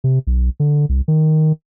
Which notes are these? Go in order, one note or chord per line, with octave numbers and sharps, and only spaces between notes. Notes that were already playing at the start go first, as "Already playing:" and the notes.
C3
B1
D3
C2
D#3